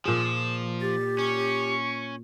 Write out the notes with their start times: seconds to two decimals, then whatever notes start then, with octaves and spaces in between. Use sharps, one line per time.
0.05 A#2 F3 G#4 E7
0.81 G4 A6
1.19 C#4 C#6